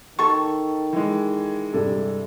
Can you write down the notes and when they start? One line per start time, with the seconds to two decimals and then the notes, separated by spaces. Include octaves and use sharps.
0.19 D#3 A4 C#6
0.93 E3 G#3
1.74 G2 C3 A4